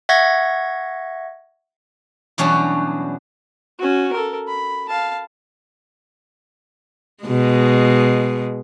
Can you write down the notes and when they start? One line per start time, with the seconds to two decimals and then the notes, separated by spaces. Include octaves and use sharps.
0.09 E5 F#5 C#6 G#6 A#6
2.38 E2 B2 F#3 G3 C#4 D4
3.79 C#4 F#4
4.13 A4 A#4
4.48 B5
4.89 F5 A5
7.24 B2 G#3